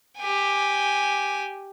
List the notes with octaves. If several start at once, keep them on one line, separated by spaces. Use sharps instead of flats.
G4 G#5